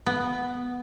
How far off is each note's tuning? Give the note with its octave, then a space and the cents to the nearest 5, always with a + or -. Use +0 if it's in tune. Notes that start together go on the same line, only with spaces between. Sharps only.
B3 +0